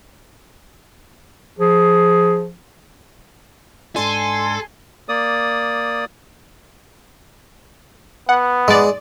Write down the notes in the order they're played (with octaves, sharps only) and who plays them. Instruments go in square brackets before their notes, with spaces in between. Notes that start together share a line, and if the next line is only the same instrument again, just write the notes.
[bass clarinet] F3 [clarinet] G#4
[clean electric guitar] G#2 D4 [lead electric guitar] A4 [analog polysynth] G#5 C6
[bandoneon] A#3 D5 D#6
[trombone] B3 [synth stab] F#5
[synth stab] G#2 D5 [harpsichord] G#3